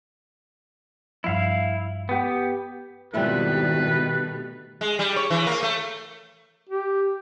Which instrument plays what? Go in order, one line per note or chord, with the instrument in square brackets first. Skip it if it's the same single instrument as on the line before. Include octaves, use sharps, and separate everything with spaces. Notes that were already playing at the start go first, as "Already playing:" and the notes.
[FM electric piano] G2 F3 [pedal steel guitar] E4 F5
[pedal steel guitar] B3 G4
[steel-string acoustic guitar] F2 G#2 E4 [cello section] B2 D#3 [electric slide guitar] G3 A3 [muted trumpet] B4
[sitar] G#3
G3
C#5
E3
A#3
A3
[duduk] G4